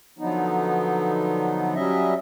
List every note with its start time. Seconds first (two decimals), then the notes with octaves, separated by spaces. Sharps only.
0.19 D3 F3 F#3 B3 D#4
1.75 F#3 G3 C#4 D#5 E5